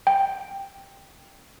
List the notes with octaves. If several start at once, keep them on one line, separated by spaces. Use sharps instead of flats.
G5